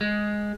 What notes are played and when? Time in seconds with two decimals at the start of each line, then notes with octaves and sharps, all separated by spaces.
0.01 G#3